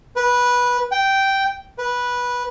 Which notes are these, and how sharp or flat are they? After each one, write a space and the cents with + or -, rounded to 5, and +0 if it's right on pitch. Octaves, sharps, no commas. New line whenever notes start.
B4 -15
G5 -10
B4 -15